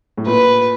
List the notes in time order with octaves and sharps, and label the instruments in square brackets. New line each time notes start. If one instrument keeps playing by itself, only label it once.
[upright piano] A2
[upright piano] A#2 [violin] B4